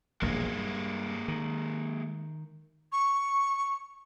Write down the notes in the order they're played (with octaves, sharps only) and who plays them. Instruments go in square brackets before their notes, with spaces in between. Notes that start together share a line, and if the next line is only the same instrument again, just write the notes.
[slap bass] E1 A#1 G2 [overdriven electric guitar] G#3 A#3
[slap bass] G2
D#3
[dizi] C#6